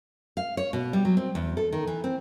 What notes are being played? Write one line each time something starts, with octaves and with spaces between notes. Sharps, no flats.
F5
C#5
B2
G3
F#3
C4
E2
A4
D#3
E3
C4